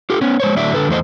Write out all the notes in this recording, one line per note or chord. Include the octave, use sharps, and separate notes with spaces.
F4 G4 A4
B3 C#4
G#3 C5 C#5
A2 D3 F#3 D5 E5
D3 A4 B4
E2 A3 C5 D#5